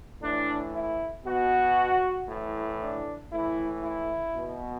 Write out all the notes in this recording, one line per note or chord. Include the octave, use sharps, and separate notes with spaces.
A2 E3 D4
E4
B2 F#4
A2 E3
D4
A2 E3 E4
E4
B2